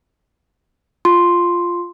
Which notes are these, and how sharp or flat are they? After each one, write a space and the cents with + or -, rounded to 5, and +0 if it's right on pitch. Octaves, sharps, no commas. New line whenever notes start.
F4 +0 C6 +0